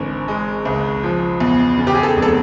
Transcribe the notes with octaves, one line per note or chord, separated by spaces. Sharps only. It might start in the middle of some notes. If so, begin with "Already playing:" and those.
Already playing: G#1 D3 E3
G#3
C#2
F3
E2
C#3
G4
G#4
A4
F1
A4